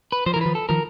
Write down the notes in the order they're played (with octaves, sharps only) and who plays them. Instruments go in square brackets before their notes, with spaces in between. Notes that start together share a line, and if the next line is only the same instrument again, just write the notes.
[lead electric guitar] B4
[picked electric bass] F3 [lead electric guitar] C5
[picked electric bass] E3 [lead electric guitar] A#4
[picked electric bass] D#3 F3 [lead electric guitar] B4
[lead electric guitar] A4
[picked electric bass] D#3 F3 [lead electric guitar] A#4